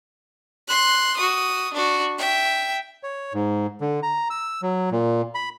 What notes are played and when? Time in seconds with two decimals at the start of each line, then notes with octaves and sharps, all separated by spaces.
0.68 C6 F#6
1.16 F#4 D#6
1.73 D4 F#4
2.18 E5 G5
3.03 C#5
3.34 G#2
3.81 D3
4.03 A#5
4.30 E6
4.62 F#3
4.92 A#2
5.35 B5